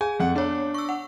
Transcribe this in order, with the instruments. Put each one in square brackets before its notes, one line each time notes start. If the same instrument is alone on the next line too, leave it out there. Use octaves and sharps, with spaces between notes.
[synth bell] G#4 [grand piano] G#5
[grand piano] F2 F#5
[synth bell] B3 C#5 [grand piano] D4
[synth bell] C#6 E6
F#5